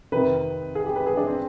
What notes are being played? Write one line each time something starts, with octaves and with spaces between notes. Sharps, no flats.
F2 C3 D#3 B4
G#4
G4
B4
G#4
D4
C4